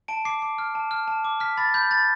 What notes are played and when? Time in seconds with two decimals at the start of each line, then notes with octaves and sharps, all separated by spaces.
0.08 A5 D7
0.25 D6 C7
0.42 D6
0.58 F6
0.75 A5
0.91 F6
1.08 A5
1.25 D6
1.40 F6 B6
1.57 B5 A6
1.74 B5 G6
1.91 B5 A6